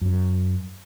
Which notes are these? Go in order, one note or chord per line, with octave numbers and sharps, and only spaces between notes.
F#2